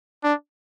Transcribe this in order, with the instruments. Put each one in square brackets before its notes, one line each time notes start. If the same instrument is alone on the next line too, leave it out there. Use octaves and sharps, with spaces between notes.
[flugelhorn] D4